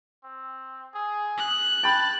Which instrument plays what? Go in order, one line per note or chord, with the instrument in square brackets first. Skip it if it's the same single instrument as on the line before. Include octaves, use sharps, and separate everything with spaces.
[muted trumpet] C4
G#4
[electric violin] F#6
[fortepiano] G5 B5 [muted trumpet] A5 [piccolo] A6